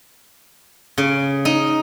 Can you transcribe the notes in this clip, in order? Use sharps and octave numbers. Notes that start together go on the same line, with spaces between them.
C#3
D#4